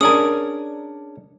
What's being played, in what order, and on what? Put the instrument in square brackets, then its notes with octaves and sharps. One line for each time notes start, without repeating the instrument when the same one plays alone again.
[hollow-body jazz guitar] C#4 D4 A#4 [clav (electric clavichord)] G#4 D5 G#5 [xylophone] D#6